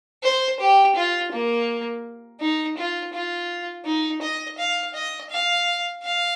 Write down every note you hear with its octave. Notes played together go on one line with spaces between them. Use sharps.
C5
G4
F4
A#3
D#4
F4
F4
D#4
D#5
F5
D#5
F5
F5